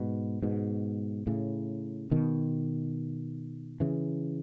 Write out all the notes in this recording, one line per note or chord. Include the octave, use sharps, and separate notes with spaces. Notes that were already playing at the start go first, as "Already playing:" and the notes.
Already playing: G#2 B2
G#2 B2
A2 C#3
B2 D#3
C#3 E3